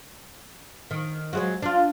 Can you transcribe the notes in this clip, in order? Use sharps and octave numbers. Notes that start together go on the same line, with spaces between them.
D#3
F#3 G#3 F#4
D4 F4